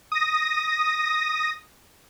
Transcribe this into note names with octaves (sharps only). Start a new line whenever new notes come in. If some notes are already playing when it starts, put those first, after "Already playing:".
D#6 A#6